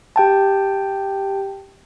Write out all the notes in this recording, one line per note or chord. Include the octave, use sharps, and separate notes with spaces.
G4 G5 A5